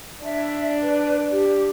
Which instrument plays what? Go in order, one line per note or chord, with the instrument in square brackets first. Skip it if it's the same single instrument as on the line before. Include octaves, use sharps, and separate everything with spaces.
[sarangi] D4 [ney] E5
[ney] B4
G4